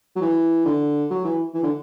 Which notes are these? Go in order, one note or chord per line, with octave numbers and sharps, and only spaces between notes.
F#3
E3
D3
F#3
E3
E3
D3